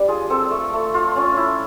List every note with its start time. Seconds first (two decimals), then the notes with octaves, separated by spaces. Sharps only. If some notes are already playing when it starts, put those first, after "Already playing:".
Already playing: G3 D4
0.08 F4 G#4
0.30 C4 A4
0.51 A3
0.73 A3
0.94 F4
1.16 C#4
1.37 E4